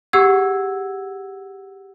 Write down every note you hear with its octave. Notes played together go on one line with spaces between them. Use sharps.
G4 G#4 F#5 E6 G#6